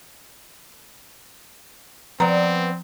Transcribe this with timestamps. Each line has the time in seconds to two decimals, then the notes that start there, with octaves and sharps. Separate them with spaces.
2.20 F3 B3 C4 D5 A#5